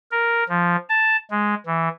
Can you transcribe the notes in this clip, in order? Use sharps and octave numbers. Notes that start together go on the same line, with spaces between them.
A#4
F3
A5
G#3
E3